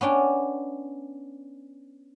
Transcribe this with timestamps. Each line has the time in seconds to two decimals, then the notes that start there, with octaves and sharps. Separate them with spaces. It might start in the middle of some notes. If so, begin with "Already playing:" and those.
0.01 B3 C#4 D4 G5